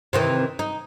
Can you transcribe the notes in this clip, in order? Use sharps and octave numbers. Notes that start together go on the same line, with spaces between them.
C3 D#3 E3
D#4